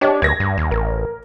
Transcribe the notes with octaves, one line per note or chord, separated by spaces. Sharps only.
D4 G4 C#5 D#5
D2 G#6 A#6
G2
D#2
A1 A#4